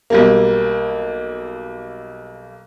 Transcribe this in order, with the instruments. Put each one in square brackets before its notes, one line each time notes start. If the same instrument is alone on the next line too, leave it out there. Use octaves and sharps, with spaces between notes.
[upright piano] B1 G3 A#3